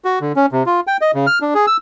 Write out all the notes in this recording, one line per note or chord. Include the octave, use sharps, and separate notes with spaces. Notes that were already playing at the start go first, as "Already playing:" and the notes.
F#4
D3
C#4
C3
F4
G5
D#5
C#3
F6
D4
G#4
E6